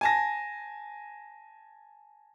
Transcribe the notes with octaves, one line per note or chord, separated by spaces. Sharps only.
G#5 A5 A#6